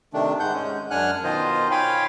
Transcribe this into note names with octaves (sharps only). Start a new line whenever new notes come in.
C3 D#3 A3 D4
G#2 G#3 F#5 G6
G#3 C#4
F#2 D4 F#5 G#5 F6 F#6
B2 D#3 F4 C5 D#5
C#5 F5 G5 G#5 B5 C6